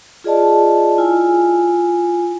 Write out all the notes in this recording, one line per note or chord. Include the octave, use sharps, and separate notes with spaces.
F4 G#4 D5 D#5 A5
E4 F4 G#5